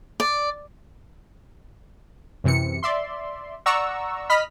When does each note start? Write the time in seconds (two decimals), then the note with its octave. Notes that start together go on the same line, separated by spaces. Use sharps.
0.20 D5
2.44 F#2 C3 E3 C#7
2.83 D5 E5 C6
3.66 D5 F#5 A#5 C#6 E6
4.30 D#5 B5 F6 B6